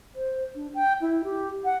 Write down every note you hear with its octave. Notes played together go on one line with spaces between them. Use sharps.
C5
D4
G5
E4
G4
F#5